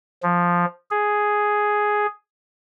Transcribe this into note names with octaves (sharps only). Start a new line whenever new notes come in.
F3
G#4